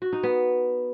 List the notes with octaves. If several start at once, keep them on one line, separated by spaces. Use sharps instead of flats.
F#4
D#4
B3